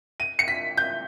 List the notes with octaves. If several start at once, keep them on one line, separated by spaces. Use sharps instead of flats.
D#7
C#7
B6
G6